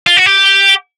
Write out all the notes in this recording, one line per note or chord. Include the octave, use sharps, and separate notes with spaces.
F4
F#4
G4